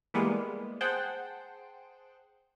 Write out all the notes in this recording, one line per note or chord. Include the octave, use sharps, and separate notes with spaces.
E3 G3 G#3 A#3 B3
G#4 C5 F#5 G5 A5